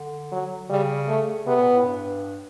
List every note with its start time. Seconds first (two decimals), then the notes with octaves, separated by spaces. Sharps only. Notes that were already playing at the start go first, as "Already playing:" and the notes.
Already playing: D3
0.32 F#3
0.69 C#3 G3
1.09 A3
1.46 C3 B3
1.59 A#2
1.73 A2
1.84 G2